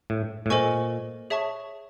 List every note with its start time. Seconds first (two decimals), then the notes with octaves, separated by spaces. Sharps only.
0.10 A2
0.46 A2
0.50 A#2 A4 C5 D#5 G#5 C#6
1.30 G#4 C#5 E5 A5 C#6